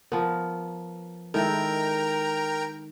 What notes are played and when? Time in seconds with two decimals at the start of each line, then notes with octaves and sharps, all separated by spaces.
0.12 F3 B3 A#4
1.34 D#3 G#3 E4 A4 A#4 G5 A#5